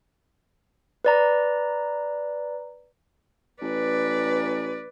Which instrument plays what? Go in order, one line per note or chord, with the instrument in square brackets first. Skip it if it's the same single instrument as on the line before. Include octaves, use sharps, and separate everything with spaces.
[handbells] B4 D5 A#5
[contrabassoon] A1 [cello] B4 D5